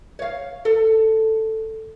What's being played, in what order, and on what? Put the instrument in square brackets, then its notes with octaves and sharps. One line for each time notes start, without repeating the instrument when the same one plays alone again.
[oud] C#5 F5
A4